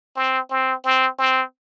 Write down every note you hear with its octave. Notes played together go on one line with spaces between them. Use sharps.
C4
C4
C4
C4